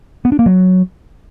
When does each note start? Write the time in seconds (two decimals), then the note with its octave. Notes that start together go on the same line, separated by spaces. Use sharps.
0.25 B3
0.32 D4
0.39 A#3
0.46 F#3